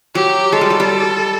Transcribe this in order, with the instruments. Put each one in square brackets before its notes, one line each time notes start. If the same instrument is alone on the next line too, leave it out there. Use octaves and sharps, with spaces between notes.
[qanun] F#3 [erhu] G4
[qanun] G#3 [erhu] A4
[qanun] G3
F#3
G3